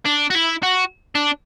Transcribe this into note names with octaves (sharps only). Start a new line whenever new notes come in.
D4
F#4
E4
F#4
D4